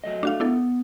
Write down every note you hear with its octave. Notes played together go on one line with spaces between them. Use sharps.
F#3 A3 D#5
A3 D4 F#4 F5
B3 D4 E4 A4